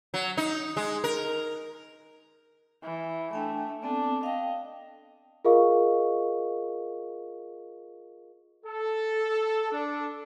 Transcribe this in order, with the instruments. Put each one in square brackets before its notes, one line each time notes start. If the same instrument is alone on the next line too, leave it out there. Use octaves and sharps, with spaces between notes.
[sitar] F#3
D#4
G#3
A#4
[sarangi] E3
[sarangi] A3 [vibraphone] D4 G5 G#5
[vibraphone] B3 C4 A4 [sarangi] D4
[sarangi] D#5 [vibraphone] F5 G5
[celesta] F4 G#4 A#4 D#5 F5 C#6
[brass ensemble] A4
D4